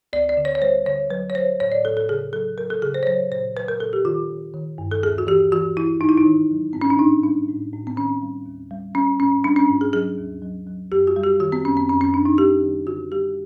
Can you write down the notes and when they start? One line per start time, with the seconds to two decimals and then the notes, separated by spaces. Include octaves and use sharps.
0.13 D2 D5
0.29 D5
0.37 D3
0.45 C#5
0.55 C#5
0.61 G3 C5
0.86 D3 C#5
1.10 F#3 B4
1.30 C#5
1.35 F#3 C5
1.60 A2 C#5
1.72 D5
1.84 A2 A4
1.97 A4
2.09 C#3 G#4
2.33 F#3 A4
2.58 F#3 A#4
2.70 A4
2.82 C#3 G#4
2.94 C5
3.03 C#5
3.07 F#3 C5
3.32 A#2 C5
3.56 F#3 B4
3.68 A#4
3.80 A#2 A4
3.93 G4
4.05 D#3 F4
4.29 D#3
4.54 D#3
4.78 G2
4.91 A4
5.03 D#2 G#4
5.18 F#4
5.27 E3 G4
5.52 E3 F#4
5.77 E3 E4
6.01 G#2 D#4
6.09 E4
6.17 D#4
6.25 D#3
6.50 F#3
6.73 G#2 C4
6.81 C#4
6.90 D4
6.99 A2 D#4
7.24 G3 D4
7.48 A2
7.73 A2
7.87 C4
7.97 D#3 C#4
8.22 G3
8.46 D#2
8.71 G3
8.95 G3 C#4
9.20 G#2 C#4
9.44 G3 D4
9.56 C#4
9.69 G#2
9.81 G#4
9.93 F#3 G#4
10.18 D#2
10.42 F#3
10.67 F#3
10.92 F#2 G4
11.07 F#4
11.16 G3
11.24 G4
11.40 D#3 F#4
11.52 C4
11.65 F#2 C#4
11.77 C4
11.89 F#2 C#4
12.01 C#4
12.13 F#2 D4
12.25 D#4
12.38 G3 G4
12.63 D#3
12.87 D3 F#4
13.12 G3 G4